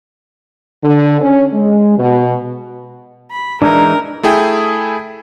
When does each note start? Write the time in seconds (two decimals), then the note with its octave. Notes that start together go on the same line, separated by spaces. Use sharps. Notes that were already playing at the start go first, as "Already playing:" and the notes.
0.84 D3
1.21 C#4
1.54 G#3
1.98 B2
3.32 B5
3.62 E3 G#3 D4 D#4 A#4
4.23 A3 E4 G#4 G5